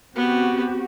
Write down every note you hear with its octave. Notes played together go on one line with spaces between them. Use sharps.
B3 C4 F#4 G4